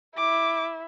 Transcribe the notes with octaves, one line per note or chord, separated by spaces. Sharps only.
E4 D6